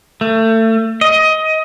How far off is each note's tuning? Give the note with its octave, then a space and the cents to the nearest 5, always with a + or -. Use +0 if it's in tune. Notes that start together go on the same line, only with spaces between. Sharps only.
A3 +30
D#5 +20